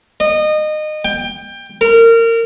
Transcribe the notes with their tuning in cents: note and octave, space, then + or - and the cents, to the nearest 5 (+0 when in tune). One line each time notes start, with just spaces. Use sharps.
D#5 -25
G5 +20
A#4 -25